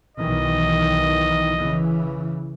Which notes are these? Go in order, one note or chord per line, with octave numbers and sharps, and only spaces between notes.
B1 D#3 E3 D#5
C#3 E3